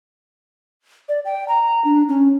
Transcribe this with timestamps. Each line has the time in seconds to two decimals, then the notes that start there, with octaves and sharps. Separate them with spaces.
1.09 D5
1.25 G5
1.48 A#5
1.85 D4
2.09 C#4